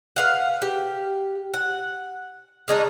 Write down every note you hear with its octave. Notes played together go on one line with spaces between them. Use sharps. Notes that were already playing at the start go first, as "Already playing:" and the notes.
B4 F5 F#5
G4
F#5
C#3 G#3 D4 D#4